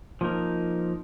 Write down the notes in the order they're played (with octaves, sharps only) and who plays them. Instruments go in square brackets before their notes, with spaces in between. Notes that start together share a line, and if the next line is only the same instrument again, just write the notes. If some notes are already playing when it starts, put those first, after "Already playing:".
[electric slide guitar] F3 A#3 D#4 A#4